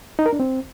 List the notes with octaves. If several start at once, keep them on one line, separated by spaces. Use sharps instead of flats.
D#4
A#4
D4
C4